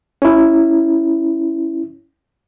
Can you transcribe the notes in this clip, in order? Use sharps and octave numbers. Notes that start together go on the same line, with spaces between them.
C#4 E4